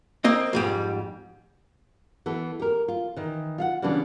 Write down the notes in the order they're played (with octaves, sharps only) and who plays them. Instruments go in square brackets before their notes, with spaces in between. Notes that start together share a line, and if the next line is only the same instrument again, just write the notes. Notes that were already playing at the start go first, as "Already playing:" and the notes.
[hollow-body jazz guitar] A#3 C4 D#5
F2 G#2 G3
[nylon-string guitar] E3 B3 A4
G4 A#4
F4
D#3 E3
F4 F5 F#5
C#3 E3 G3 B3 D4